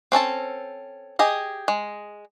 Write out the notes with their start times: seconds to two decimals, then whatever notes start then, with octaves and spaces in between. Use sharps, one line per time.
0.12 C4 C#4 A4 A5
1.19 G4 G#4 D#5
1.68 G#3